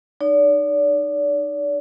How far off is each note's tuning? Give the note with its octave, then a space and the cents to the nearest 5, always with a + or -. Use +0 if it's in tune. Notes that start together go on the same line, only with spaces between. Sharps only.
D#4 -35 D5 -40